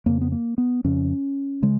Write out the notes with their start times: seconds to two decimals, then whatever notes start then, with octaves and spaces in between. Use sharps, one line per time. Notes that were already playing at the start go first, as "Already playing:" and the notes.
0.06 F2 C#3 A#3
0.21 B3
0.32 A#3
0.58 B3
0.84 F2 C#3 C#4
1.62 C#3 G#3